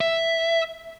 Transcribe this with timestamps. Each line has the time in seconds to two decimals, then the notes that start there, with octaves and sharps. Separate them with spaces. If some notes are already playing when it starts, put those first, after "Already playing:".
0.01 E5